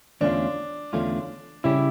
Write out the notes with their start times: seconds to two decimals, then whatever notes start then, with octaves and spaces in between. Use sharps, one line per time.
0.21 E2 D3 A3 C#4 D4 F4
0.93 E2 D3 A3 C#4 F4
1.64 C#3 G3 C#4 E4 G4